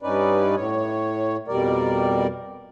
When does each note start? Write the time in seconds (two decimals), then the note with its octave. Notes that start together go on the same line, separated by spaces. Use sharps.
0.02 G2 C#4 D#4 B4 D5
0.56 A2 C#5
1.48 F2 B2 G3 A#4 D5